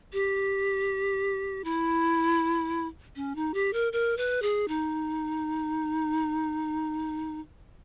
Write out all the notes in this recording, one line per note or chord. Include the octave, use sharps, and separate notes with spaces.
G4
E4
C#4
D#4
G4
A#4
A#4
B4
G#4
D#4